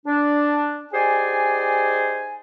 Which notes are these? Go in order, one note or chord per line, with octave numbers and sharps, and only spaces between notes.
D4
D#4 G4 G#4 C5 D5 G#5